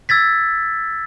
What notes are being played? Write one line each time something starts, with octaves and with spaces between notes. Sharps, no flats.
E6 G#6 A6 B6